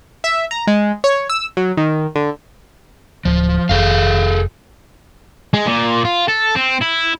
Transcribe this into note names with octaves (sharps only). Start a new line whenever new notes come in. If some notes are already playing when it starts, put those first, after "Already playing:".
E5
A#5
G#3
C#5
E6
F#3
D#3
D3
D1 F3
F1 G#4 A4 F5
G#3
A#2
F4
A4
C4
E4